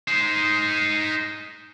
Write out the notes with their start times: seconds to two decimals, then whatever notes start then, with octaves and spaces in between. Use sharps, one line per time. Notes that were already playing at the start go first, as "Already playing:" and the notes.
0.08 D#4 C5